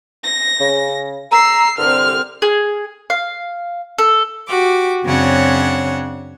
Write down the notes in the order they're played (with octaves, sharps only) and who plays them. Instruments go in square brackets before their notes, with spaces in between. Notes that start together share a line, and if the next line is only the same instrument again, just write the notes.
[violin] A#6
[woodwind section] C#3
[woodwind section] A#5 [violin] E6 C7
[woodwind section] C2 G2 D3 [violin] C4 F6
[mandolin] G#4
F5
A4
[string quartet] F#4 G4 D6
F#2 C#3 C4 D4 C#5 F#5